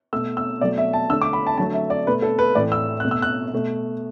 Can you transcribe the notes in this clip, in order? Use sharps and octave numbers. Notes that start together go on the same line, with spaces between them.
B2 A3 E6
E6
B2 F#3 A3 D5
E5
A5
D3 A3 E6
D6
B5
A5
D3 F#3 A3 A5
E5
D5
B2 A3 B4
A4
B4
A2 E3 A3 D5
E6
B2 A3 F#6
E6
F#6
B2 A3